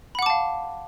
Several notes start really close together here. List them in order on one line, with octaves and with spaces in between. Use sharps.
B5 F#5 D6 A5 F5